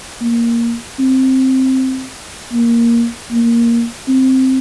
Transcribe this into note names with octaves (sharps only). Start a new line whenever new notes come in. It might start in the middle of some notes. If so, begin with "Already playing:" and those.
A#3
C4
A#3
A#3
C4